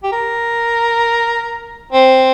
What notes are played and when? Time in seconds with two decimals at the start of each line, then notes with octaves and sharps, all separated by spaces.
0.04 G4
0.12 A#4
1.92 C4